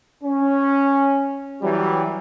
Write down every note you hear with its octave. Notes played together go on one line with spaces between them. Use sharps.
C#4
E3 F#3 G3